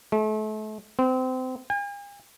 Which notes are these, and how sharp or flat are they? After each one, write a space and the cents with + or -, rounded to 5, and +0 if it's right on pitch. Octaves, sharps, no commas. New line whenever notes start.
A3 -35
C4 -30
G#5 -45